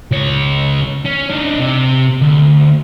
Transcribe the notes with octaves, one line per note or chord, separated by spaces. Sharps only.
C#2 C#5
C#4
D4 D#4
C3
D2